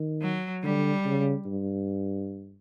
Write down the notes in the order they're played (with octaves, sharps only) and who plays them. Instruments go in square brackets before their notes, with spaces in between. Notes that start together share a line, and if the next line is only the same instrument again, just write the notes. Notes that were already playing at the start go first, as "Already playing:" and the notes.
Already playing: [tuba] D#3
[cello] F#3
[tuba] D3 [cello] G3
[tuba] C#3
G2